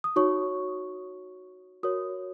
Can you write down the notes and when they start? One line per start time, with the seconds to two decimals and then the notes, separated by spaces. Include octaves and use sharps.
0.04 D#6
0.16 D#4 F#4 C#5 C#6
1.83 F#4 A#4 C#5 D#6